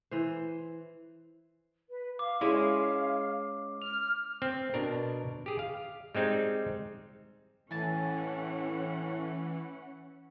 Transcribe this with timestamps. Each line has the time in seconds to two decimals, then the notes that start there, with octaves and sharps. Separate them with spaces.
0.11 E3 C5
1.90 B4
2.19 F5 D6
2.41 G#3 C#4 E4 G#4 C#5
3.82 F6 F7
4.42 C4
4.74 B2 D4 A#4
5.46 G4 G#4
5.59 F5
6.15 G3 G#3 C4 D#4
7.71 A2 E3 C#4 F#5 G#5 A5